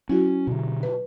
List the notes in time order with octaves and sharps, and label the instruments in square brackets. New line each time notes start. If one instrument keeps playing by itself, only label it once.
[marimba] F#3 E4 F#4 [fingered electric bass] C#4
[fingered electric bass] B2 D3
[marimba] B4